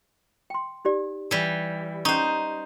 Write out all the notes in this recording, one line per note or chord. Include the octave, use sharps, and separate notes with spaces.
G5 C6
D#4 G4 D5
E3 G3
C#4 D#4 C5 C#6